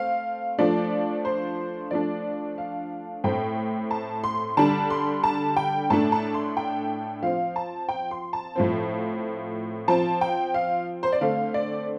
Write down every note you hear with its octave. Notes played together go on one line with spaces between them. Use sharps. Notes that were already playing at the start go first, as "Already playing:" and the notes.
Already playing: A3 C4 F5
F3 A3 D4 D5
C5
F3 A3 D4 D5
F5
A2 A3 C4 G5
A5
C6
D3 G3 D4 A5
C6
A5
G5
A2 A3 D4 A5
A5
C6
G5
F3 C4 F5
A5
G5
C6
A5
A2 F3 C4
F3 C4 A5
G5
F5
C5
D5
D3 A3 C4 F5
D5